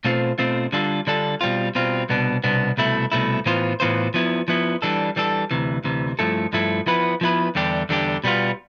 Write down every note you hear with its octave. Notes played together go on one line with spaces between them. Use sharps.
B2 A3 C4 F4 C5
B2 A3 C4 F4 C5
D3 G3 D4 F4 A4
D3 G3 D4 F4 A4
B2 G3 C4 F4
B2 G3 C4 F4
C2 B2 B3 D4
C2 B2 B3 D4
C2 B2 A3 E4
C2 B2 A3 E4
A2 E3 B3 F4 C5
A2 E3 B3 F4 C5
F3 B3 E4
F3 B3 E4
E3 G3 D4 A4
E3 G3 D4 A4
D2 C3 E3
D2 C3 E3
G2 F3 A3 E4 A4
G2 F3 A3 E4 A4
F3 B3 E4 B4
F3 B3 E4 B4
E2 D3 G3 D4 G4
E2 D3 G3 D4 G4
B2 G3 B3 F4